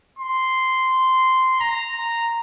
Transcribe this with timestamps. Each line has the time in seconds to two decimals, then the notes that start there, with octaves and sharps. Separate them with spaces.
0.19 C6
1.61 A#5